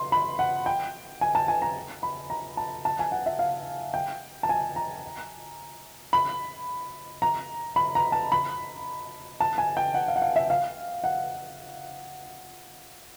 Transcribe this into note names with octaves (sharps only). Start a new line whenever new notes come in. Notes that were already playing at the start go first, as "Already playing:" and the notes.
Already playing: C6
B5
F#5
G5
G#5
A5
G#5
A#5
B5
A#5
A5
A5
G#5
F#5
E5
F5
G5
A5
G#5
A#5
B5
A#5
B5
A#5
A5
B5
A5
G#5
G5
F#5
F5
F#5
F5
E5
F5
F#5